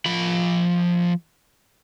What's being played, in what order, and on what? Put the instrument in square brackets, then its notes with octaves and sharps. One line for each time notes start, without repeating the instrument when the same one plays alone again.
[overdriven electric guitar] F3 B5